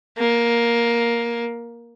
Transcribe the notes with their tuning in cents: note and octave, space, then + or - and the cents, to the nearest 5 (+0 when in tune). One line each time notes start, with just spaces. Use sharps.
A#3 +10